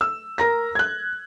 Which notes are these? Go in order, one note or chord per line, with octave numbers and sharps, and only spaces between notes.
E6
A#4 A#5 A#6
F#6 G#6